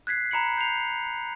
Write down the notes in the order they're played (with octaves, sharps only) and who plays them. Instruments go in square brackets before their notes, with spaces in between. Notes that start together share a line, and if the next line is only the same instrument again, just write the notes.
[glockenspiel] F#6 G#6 B6 C7
A#5 B5 C#7 F#7
G6 C7 F7